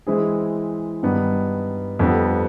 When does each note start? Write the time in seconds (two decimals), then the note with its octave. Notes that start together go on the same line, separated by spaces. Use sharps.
0.07 E3 G#3 C4 E4 G#4
1.03 G2 D#3 G3 B3 D#4
1.99 F2 D3 G3 B3